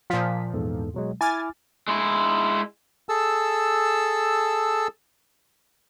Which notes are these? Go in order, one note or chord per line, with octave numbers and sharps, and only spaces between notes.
A#2 F3 F5 B6
E2 G#2 A4
B2 F#3 G#3
E4 G#5 D6 F6 A6
G#3 E4
G#4 A4 A5 E6